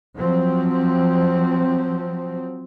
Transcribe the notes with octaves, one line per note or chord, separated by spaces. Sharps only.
F3 F#3 C4